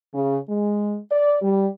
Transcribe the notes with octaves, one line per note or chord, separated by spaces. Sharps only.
C#3
G#3
D5
G3